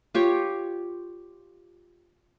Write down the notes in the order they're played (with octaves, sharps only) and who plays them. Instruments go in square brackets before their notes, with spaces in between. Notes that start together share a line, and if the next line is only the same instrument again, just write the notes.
[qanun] F4 G4 C#5